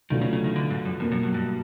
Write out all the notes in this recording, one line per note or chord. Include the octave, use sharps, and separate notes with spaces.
C#2 B2 D#3 F#3 A3 D4
C#3
C#3
D#3
D3
G#2
F#2
F2 B2 F#3 A#3
F#2
G2
G2